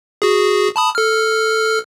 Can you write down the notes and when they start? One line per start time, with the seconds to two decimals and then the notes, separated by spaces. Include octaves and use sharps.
0.22 F#4 G#4
0.76 A5 B5 D#6
0.95 A4 F6